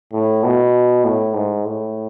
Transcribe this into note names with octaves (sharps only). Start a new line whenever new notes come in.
A2
B2
A2
G#2
A2